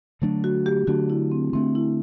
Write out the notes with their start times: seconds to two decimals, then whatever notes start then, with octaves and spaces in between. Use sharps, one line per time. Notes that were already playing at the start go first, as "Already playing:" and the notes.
0.22 D3 F#3 A3 D4
0.44 F#4
0.66 G4
0.87 D3 F#3 A3 D4 F#4
1.10 E4
1.32 C4
1.53 D3 A3 C4 D4
1.75 E4